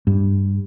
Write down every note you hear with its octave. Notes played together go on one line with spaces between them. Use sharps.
G2